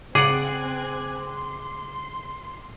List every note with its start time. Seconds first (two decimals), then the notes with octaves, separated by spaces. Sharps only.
0.15 C#3 C4 G#4 D5 F#5 G#5 D6 F#6
1.23 C6